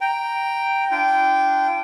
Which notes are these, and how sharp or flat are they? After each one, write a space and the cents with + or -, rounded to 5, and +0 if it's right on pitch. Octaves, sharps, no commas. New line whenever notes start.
G5 +0 A#5 +0
D4 +0 F4 -40 G5 -10